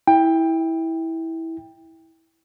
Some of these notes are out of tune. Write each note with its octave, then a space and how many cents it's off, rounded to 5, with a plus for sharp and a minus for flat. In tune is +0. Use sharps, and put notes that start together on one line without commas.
E4 -15 G5 +20